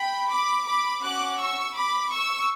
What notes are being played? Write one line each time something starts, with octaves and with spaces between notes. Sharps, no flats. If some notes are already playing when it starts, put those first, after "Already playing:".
Already playing: G5 B5
B5 D6
B5 D6
C#4 F#4 D6 F#6
C#6 E6
B5 D6
C#6 E6